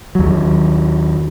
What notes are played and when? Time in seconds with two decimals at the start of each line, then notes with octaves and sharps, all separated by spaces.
0.15 D#2 F#3